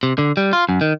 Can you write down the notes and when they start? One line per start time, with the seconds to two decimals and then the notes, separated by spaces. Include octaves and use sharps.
0.03 C3
0.18 D3
0.37 G3
0.53 F4
0.69 F#2
0.81 D#3